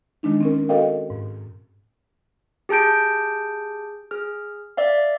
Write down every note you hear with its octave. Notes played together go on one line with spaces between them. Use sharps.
D#3 G#3 D4 D#4
C4 C#4 A#4
F#4 A4 A#4 D#5 F5 G5
G#2
G4 G#4 A5 G6 D7
G#4 F6
D5 E5 F5